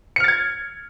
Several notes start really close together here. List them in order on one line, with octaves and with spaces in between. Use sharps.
C#7 F6 A6 G#6